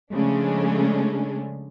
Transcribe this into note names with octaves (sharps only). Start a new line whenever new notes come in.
C#3 F3 G#3 A3 C#4 D4